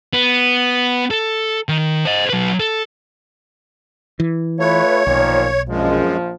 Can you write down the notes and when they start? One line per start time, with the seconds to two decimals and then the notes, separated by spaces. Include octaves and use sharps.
0.13 B3
1.11 A4
1.69 D#3
2.05 C5 D#5
2.30 F#3 B4
2.60 A4
4.20 E3
4.60 A3 F4 B4 C#5
5.07 B1 A#2 D#3 F3
5.69 A#1 F#2 F3 G#3